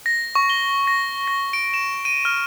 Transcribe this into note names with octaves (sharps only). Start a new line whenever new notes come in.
A#6
C#6
G7
A#6
A#6
D7
E7
D#7
F6